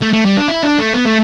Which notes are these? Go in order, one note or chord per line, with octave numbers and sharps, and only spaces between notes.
A3
A3
G3
D4
E4
D4
A3
B3
A3